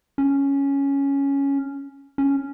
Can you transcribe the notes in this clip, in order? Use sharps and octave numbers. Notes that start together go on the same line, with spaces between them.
C#4
C#4